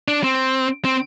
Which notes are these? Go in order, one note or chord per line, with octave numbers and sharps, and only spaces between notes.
D4
C4
C4